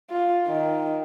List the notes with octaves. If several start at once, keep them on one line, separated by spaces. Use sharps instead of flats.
F4
D#3